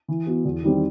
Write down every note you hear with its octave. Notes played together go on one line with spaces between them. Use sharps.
E3
B3 F#4
E2
D#3 G3 C4